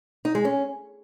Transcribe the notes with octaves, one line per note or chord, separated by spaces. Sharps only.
D#4
G#3
C#4